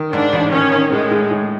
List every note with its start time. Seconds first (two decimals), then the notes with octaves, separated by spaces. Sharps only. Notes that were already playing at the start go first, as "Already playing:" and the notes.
Already playing: D#3
0.13 G#2 D4
0.33 A1
0.52 D#3 C#4
0.72 D#3
0.92 A2 G#3
1.11 A2
1.31 A2